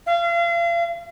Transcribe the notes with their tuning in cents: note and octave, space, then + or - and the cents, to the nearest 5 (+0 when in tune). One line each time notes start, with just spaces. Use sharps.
F5 -35